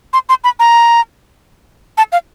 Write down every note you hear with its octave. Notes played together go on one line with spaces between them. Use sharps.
C6
C6
B5
A#5
A5
F5